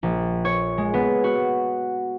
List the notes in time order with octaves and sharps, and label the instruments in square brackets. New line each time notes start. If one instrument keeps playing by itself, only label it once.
[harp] A#1
C#5
G#3
B3
F#4